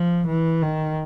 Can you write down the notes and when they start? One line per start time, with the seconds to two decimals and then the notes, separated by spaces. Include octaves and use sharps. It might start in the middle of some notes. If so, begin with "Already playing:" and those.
Already playing: F3
0.27 E3
0.62 D#3